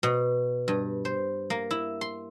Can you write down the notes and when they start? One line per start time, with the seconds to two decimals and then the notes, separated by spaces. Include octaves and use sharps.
0.03 B2
0.68 G2
1.05 C5
1.50 A#3
1.71 E4
2.01 C6